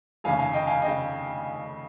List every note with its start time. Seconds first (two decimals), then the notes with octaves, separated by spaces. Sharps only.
0.24 F1 D#2 C#3 F5 G#5
0.39 F5 G#5
0.53 D#5 G5
0.67 F5 G#5
0.82 C#3 D#5 G5